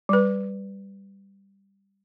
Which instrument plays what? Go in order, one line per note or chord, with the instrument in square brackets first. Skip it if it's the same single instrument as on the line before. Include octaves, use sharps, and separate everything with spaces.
[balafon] G3 B4